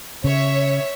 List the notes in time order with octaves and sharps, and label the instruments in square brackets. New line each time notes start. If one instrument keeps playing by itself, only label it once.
[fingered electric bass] C#3 [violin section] C#5 E5